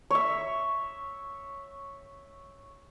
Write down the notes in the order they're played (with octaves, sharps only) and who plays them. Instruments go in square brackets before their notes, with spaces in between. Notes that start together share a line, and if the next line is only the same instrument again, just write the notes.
[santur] C#5 E5